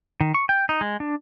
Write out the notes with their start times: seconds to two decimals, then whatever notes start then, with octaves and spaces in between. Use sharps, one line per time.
0.21 D#3
0.34 C#6
0.49 G5
0.69 D#4
0.81 G#3
1.00 D4